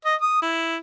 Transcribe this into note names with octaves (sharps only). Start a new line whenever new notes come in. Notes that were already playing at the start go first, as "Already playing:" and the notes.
D#5
D#6
E4